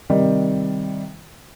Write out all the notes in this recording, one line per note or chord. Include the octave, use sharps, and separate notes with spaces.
C3 D#3 G3